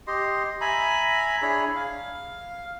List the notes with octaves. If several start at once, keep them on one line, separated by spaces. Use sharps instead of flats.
G4 D#5 C6
E5 G#5 A#5 B5
D4 E4 G#4 C#5
F5